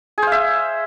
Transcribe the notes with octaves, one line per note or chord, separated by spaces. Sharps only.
G#4 C5 E5 F5